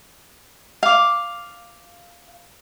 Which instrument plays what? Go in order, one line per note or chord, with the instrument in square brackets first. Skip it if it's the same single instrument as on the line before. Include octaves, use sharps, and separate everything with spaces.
[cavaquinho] F5 D6